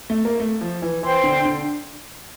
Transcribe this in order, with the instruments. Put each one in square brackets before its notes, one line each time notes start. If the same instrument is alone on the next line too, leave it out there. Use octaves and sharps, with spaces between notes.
[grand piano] A3
A#3
A3
F3
E3
[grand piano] E3 [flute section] C5 G5 C6
[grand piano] D3
D3